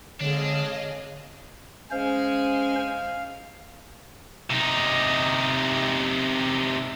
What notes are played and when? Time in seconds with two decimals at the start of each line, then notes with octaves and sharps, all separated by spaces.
0.21 D3 G#3 C4 D4 G#4 C#5 D#5 F5
1.91 G#3 C#4 C5 F5 G#5
4.50 C3 D#4